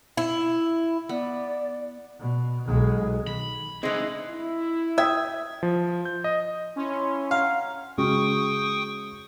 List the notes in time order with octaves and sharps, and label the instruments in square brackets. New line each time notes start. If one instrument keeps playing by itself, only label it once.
[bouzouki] E4
[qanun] B3 [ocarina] D5
[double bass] B2
B1 G#3
[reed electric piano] D#3 [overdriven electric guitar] B5
[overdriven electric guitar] A2 D3 [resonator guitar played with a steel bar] E3 G#3 [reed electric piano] C4 D#4
[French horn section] E4
[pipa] E5 [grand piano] G5 D#6 G#6
[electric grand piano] F3
G6
D#5
[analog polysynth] C#4 [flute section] E4 C6
[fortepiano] F5 [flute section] F#5 A#5 F6
[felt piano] C#3 G#3 F#4 [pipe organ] G5 C#6 D#6